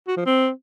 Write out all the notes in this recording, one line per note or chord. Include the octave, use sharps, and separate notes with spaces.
F#4
F3
C4